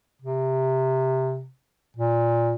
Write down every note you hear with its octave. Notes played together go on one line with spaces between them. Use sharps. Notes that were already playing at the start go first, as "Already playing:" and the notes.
C3
A#2